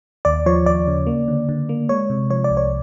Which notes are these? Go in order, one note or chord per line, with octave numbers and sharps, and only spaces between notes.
D#2 D5
F3 C#5
D#2 D5
C#3
A#3
D3
D3
A#3
G#3 C#5
C3
F3 C#5
D5
C2
C#5